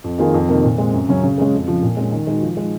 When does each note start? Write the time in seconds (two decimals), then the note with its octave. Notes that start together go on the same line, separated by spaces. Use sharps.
0.04 F2
0.18 D#3 A#3 F4 G#4
0.34 F2
0.49 C3 D#3 A#3
0.64 A#2
0.78 G#3 C4
0.93 F#2
1.08 C#3 F#3 C#4
1.23 C#3
1.38 G#3 C#4 G#4
1.53 F2
1.68 C#3 F3
1.82 A#2
1.97 G#3 C#4
2.12 D#3
2.27 G#3 D#4 F#4
2.42 F3
2.57 G#3 D#4